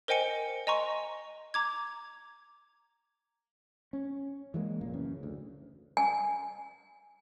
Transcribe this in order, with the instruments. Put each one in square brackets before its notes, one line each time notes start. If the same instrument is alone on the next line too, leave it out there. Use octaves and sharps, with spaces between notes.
[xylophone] A#4 C5 D#5 G5 G#5 C#7
D#5 G#5 A#5 C6 C#6
A#5 D6 G#6
[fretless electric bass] C#4
E3 G#3 A#3
F1 A#2 A#3
F#2 C#3 E3
D2
[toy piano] G#5